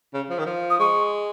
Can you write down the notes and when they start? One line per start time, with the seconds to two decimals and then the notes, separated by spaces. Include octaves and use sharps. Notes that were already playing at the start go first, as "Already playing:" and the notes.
0.14 C#3
0.30 F3
0.38 D#3
0.46 F3
0.70 D#6
0.79 G#3 C#6